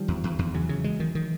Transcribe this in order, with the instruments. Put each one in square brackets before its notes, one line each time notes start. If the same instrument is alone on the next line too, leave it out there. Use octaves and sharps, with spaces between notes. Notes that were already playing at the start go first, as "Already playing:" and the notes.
Already playing: [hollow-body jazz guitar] D#3 F3 [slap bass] G3
[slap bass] E2
E2
E2
[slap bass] C#3 [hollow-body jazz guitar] E3 F#3
[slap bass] C#3
G#3
D#3
D#3